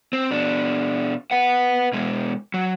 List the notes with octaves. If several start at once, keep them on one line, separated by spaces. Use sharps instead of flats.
C4
B2 D4
B4 F#5
B2 G#3
F#3